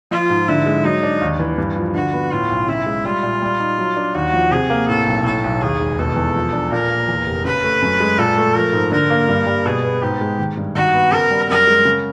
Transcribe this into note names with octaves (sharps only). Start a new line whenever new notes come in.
F3 F4
G#2
D3 E4
G#3
F#3 D#4
D4
D#2
E3
G2
F3
D3 F#4
B3
A2 F4
B1
C#3 E4
G#3
G3 F4
A#2
G3
D#4
F#3
D4
D#2 F#4
F3
C3 G#4
A#3
A2 A4
B1
A2 A4
B1
D#2 G#4
E1
B2 A4
E2
F3
D4
A#2 A#4
A#3
E2
F1
C#3 B4
A3
F#2
G#3
A#2 A4
A3
F3 A#4
G#2
D3 A#4
A#3
G2
G3
B2 G#4
B3
G#2 G4
G#3
D#3
G2
D#3 F#4
B3
C#3 A#4
G3
F#2 A#4
G#3
C#3